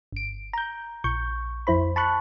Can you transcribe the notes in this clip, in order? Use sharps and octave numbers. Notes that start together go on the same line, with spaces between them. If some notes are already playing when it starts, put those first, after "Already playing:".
G1 D7
A#5 G6
A#1 C#6 G6
F2 E4 C5 B5
A5 B5 C#6 F#6